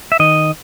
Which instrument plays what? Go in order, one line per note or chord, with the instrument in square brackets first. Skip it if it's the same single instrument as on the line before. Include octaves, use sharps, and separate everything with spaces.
[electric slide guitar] E5
D#3 D#5